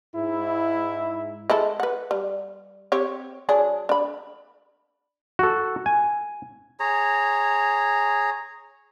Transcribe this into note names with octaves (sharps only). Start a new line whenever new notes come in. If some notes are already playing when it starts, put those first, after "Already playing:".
G#2 E4
G#3 E4 A4
B4 F#5
G3
C4 G4 C#5
F#3 D4 G#4
D4 B5
F#4 A4
G#5
G#4 C#5 A#5